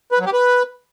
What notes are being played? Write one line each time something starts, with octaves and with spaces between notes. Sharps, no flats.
B4
F#3
G4
B4